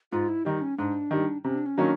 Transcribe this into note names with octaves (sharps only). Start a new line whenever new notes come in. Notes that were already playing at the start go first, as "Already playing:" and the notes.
G#2 F4
E4
D#3 G3 D#4
C#4
G#2 D4
D#3 G3
C3 C#4
D4
C#4
D#3 F#3 A#3 C#4 D4